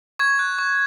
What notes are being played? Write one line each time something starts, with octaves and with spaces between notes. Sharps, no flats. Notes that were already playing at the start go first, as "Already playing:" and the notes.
C#6 G#6
F#6
C#6